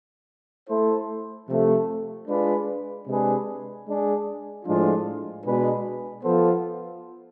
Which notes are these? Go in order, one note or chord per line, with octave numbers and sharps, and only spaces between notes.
A3 E4 A4 C5
C3 F3 A3
G#3 D4 F4 G#4 B4
C3 G#3 D4 G#4 B4
G#3 D4 G#4
A2 F3 G#3 D4 F4
B2 G#3 D4 G#4 B4
F3 B3 F4 A4 C5